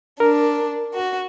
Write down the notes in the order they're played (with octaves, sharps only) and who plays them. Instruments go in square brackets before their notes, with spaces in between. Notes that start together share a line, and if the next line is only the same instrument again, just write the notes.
[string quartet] D4 [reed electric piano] A#4
[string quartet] F#4